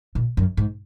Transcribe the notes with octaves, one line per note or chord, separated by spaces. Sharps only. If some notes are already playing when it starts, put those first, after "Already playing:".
A#2
F#2
G#2